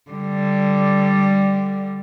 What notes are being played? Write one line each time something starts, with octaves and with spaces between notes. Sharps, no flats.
D3 G3